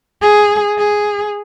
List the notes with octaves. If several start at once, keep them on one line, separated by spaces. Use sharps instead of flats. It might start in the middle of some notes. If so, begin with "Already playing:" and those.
G#4
G#4